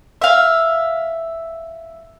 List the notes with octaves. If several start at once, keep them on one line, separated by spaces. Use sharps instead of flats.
E5 F5